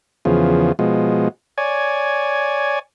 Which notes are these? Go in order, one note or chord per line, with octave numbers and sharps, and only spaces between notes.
E2 C#3 F3
B2 F3 G#3
C#5 D5 G#5